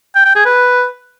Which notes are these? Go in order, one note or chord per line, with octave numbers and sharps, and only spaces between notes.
G5
G5
G#4
B4